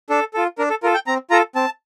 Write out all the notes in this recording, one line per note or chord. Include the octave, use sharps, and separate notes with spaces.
D4 A4
F4 A4
D4 A#4
A4
F4 A4 A#4
G5
C4 A#5
F4 A4 A#5
C4 A5